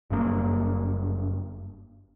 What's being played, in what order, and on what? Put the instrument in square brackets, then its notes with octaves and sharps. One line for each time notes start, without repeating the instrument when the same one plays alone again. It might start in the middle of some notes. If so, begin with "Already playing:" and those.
[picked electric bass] F#1 G2 B2 A#3